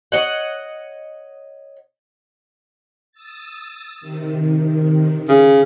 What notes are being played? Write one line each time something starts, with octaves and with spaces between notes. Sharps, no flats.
C#5 D#5 F#5
D#6 E6 A6
C3 D#3
C#3